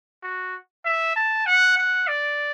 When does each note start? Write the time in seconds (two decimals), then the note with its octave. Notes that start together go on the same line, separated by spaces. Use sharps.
0.23 F#4
0.85 E5
1.16 A5
1.46 F#5
1.78 F#5
2.08 D5